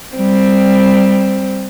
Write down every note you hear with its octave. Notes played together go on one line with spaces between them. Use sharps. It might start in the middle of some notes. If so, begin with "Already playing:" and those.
G3 C4